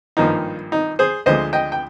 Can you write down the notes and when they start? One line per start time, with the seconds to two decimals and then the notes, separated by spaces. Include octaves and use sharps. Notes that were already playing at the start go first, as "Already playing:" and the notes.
0.17 G#1 G2 F3 A#3 D#4
0.72 D#4
0.99 G#4 C5
1.26 D2 D3 F3 G#3 C5 D#5
1.53 D#5 G5
1.72 G5